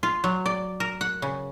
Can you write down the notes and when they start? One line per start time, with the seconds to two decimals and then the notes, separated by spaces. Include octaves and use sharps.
0.03 F4
0.24 F#3
0.46 D5
0.80 A#4
1.01 F#5
1.22 C#3